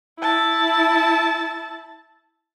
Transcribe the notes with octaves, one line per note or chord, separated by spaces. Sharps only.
E4 A5